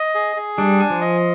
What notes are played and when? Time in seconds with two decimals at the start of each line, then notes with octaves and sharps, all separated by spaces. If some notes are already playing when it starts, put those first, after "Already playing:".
Already playing: D#5
0.15 G#4
0.36 G#4
0.58 G3 D4
0.80 G#5
0.90 F3
1.01 D#5